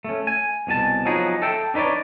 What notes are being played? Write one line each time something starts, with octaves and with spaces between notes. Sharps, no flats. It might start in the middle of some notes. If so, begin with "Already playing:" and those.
A3 C#4
G#5
C2 B2 G#5 A5
F3 F#3 B3 D#4 G#4
A4 E5 G5
D4 D#4 B4 C#5 D5